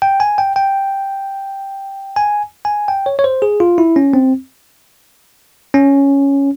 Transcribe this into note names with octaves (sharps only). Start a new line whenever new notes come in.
G5
G#5
G5
G5
G#5
G#5
G5
C#5
C#5
C5
G#4
F4
E4
C#4
C4
C#4